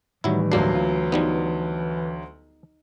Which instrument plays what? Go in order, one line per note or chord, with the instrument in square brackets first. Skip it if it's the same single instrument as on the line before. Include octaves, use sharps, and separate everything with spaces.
[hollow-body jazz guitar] A2 D#3 G3 [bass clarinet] E3 [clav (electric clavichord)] F#3 E4
[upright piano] D2 F#3 C7 [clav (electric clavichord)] A#3 D4
[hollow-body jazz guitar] F4
[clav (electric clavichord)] F3 G3 B3 [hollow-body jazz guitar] D#4